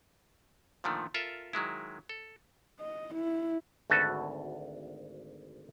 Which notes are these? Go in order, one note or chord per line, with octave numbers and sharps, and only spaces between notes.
A#2 D3 D#3 F3 A3
F4 A4 A#4 E5
D#3 F#3 G#3 E4
A4
D#5
E4
G#1 D2 F#4 A4 B4